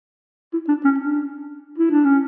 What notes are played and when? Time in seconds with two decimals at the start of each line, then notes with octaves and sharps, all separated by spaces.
0.53 E4
0.68 D4
0.85 C#4
1.00 D4
1.78 E4
1.91 D4
2.05 C#4